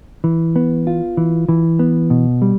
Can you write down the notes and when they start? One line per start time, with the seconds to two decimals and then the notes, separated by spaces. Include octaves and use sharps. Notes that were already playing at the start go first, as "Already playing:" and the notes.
0.24 E3
0.56 B3
0.87 F4
1.17 E3
1.49 E3
1.79 B3
2.10 B2
2.42 G3